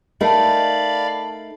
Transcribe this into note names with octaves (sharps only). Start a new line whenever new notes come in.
A3 D#4 A#4 D5 D#5 F5 A5 B5